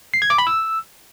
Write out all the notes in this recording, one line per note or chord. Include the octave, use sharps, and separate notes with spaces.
C7
G#6
D6
B5
E6